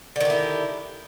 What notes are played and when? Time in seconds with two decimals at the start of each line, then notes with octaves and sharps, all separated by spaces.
0.16 D3
0.20 D#3
0.25 G4
0.30 E4